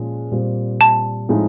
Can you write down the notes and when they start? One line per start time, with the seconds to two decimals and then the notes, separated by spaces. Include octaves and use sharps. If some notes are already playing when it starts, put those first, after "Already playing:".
Already playing: A#2 F3 G#3 C#4
0.31 A#2 G3 C4
0.81 A5
1.29 A2 F3 G#3 C4 D#4